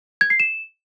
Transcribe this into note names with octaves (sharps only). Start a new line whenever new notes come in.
G#6
C7
E7